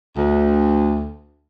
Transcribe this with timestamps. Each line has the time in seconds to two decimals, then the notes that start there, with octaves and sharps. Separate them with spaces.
0.16 D2